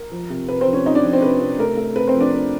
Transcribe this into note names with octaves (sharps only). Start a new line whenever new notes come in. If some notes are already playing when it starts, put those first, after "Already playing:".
Already playing: A#4
F3
C3
C3 B4
C4 C5
F3
C#4 C#5
C3 D#4 D#5
D4 D5
F3
C4 C5
C3 B4
C3
A3 A#4
A3
C4 B4
C4 C5
F3
D4 D5
C4